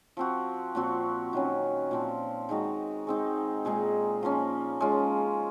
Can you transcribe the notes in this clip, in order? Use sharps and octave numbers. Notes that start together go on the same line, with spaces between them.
F3 C4 F#4
A#2 F3 C4 F#4
D#3 F#3 C#4
A#2 F3 C4
D#3 G#3 D#4 F#4
G#3 C4 D#4
A#2 G#3 D#4 G#4
F3 A#3 C#4
G#3 C#4 F4